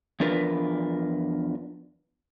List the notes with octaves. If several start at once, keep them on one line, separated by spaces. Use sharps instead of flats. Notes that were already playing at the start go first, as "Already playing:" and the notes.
E2 F3 D4 F4 A#4 B4